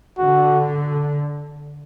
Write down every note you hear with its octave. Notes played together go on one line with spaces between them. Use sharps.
D3 F#4